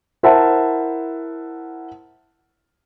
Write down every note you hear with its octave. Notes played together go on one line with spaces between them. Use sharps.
E4 A#4 C5 E5 F#5 A5